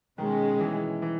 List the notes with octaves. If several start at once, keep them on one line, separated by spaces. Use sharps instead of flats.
B2 D#3 G#3 C#4
E3
E3